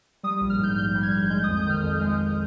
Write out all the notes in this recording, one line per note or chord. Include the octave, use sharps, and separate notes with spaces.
G3 D#6
A#1
F6
G#2 G6
A#1 G6
G3
G#6
A#1
G#3 G6
D#6
F2
G6
D#3 F6
F2
G#3
F2